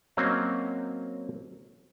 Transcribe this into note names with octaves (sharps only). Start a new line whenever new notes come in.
F#3 A#3 C4 C#4 D#5 F5